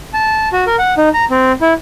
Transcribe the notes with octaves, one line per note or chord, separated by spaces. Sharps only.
A5
F#4
A#4
F#5
D#4
A#5
C4
E4